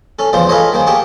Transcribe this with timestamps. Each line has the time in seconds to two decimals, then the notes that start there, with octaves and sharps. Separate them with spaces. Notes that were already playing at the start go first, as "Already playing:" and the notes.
0.19 C#4 A4
0.33 A1 E2 C#3 F3 C5 C6
0.49 F4 G#4 A4 B4 C#5 D#5
0.72 D#3 A#3 G#4 C5
0.87 A#3 G4 G#4 A5 C#6